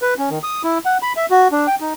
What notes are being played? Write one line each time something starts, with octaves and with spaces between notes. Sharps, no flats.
B4
C#4
D#3
D#6
E4
F#5
B5
E5
F#4
D4
G5
D#4